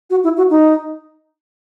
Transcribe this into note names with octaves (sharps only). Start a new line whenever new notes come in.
F#4
E4
F#4
D#4